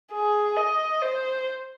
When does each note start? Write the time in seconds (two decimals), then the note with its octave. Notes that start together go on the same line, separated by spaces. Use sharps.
0.13 G#4
0.57 D#5
1.02 C5